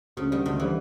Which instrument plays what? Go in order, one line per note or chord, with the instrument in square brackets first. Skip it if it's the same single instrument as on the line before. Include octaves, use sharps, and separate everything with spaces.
[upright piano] D2 [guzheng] C#3
[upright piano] D3 G3 [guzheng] D#3
[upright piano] D2 [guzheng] D#3
[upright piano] D3 G3 [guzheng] E3